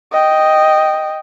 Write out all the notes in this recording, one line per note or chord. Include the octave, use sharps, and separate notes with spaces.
D#5 G5